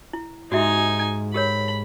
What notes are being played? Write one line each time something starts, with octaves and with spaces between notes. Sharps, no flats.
E4
G#2 D#4 F#4 G4 E5 G#5
G4 A#4 C#5 B5